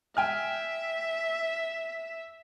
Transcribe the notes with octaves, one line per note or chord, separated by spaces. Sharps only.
E5 G5 G#5 F6